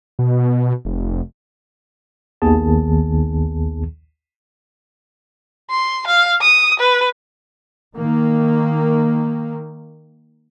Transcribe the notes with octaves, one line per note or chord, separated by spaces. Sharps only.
B2
F1
A#1 D#2 D#3 B3 G#4 A5
C6
F5
D#6
B4
D#3 A#3